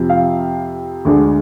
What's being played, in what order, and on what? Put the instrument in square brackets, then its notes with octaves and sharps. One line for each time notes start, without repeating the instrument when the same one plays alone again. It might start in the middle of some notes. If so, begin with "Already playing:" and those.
Already playing: [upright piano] F2 C3 F3
F5
D2 D3 G#3